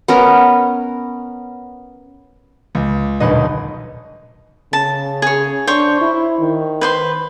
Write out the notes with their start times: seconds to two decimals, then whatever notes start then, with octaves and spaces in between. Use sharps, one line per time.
0.08 B3 C#4 A#4
2.75 C#2
3.20 D#1 B1 D3 B4 D#5
4.73 C#3 A5
5.22 G#4 C#5
5.67 D4 C5 C#5 C#6
6.01 E4
6.40 D#3
6.81 B4 C5 C6